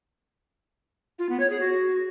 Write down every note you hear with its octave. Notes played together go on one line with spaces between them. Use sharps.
F4
B3
C#5
G#4
F#4